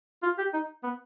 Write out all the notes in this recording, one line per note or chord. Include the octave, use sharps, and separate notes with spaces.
F4
G4
D#4
B3